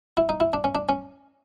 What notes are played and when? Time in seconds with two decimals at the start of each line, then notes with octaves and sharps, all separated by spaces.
0.17 E4
0.29 D#4
0.40 E4
0.53 D4
0.64 C#4
0.75 D4
0.89 C#4